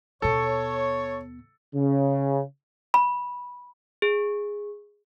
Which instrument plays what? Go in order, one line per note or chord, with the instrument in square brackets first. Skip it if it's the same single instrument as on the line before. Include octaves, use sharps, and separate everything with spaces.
[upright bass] D#2 B2 [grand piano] A4 [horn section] C#5
[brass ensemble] C#3
[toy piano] B5
[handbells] G#4